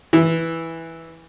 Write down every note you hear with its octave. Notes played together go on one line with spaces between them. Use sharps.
E3